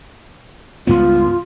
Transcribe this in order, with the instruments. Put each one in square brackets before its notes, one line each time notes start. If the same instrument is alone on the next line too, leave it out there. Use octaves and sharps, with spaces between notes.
[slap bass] C#2 G2 B3 [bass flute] F4